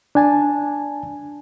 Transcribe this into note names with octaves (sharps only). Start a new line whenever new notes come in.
D4 G#5 A5